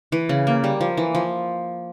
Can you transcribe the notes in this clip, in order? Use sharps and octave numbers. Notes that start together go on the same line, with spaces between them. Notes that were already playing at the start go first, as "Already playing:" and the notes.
E3
C#3
A#3
G3
F3
E3
F3